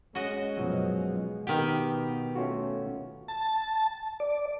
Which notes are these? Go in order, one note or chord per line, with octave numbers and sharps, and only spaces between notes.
G#3 C#4 F#4 D#5
F#2 B2 F3 F#3
B2 D#3 B3 G4 F#5
A3 C#4 F4 F#4
A5
D5